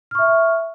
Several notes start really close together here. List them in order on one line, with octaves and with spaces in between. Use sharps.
F6 C#6 E5